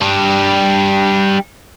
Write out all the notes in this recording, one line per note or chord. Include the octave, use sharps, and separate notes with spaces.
G3 D4